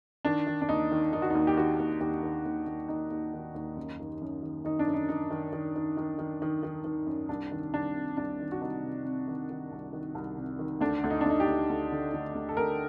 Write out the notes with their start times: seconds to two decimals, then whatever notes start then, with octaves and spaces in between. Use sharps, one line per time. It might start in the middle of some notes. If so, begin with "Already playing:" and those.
0.25 D#3 D4
0.47 D#3
0.61 D4
0.69 D#2 D#4
0.92 D#3
1.13 D#3 D#4
1.22 F#4
1.30 D#2 D#4
1.47 G4
1.57 D#3 F#4
1.79 D#2
2.00 D#2 G4
2.23 D#3
2.45 D#2
2.67 D#2
2.88 D#2 D#4
3.10 D#2
3.33 D#3
3.55 D#2
3.77 F#2
4.00 D#3
4.21 F#2
4.43 D#3
4.65 D#3 D#4
4.79 D4
4.87 F#2
4.93 D#4
5.09 D#3 D#4
5.31 D#3
5.53 D#3
5.76 D#3
5.97 D#3
6.19 D#3
6.42 D#3
6.63 D#3
6.85 D#3
7.07 F#2
7.29 C2 D4
7.51 D#3
7.73 C2 D4
7.95 C3
8.17 C2 D4
8.40 D#3
8.52 F#4
8.61 C2 D#4
8.83 C3
9.05 C3
9.28 D#3
9.50 D#3
9.72 C2
9.93 D#3
10.15 C2
10.37 C3
10.59 D#3
10.81 D2 D4
11.04 D2
11.10 D#4
11.21 D4
11.26 D2 D#4
11.40 G4
11.47 D2
11.69 D2
11.92 D3
12.14 D3
12.35 D2
12.49 A4
12.57 D2 A#4